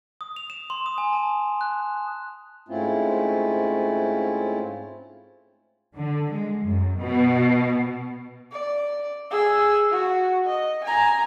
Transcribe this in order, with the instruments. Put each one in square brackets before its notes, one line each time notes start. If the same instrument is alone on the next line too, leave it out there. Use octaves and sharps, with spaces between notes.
[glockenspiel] D#6
F7
E7
C6
D#6
G#5
A5
F#6
[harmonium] G#2 A3 C4 C#4 E4 F4
[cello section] D3
G#3
F#2
B2
[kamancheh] D5
G#4 E6
F#4
D#5
G#5 A#5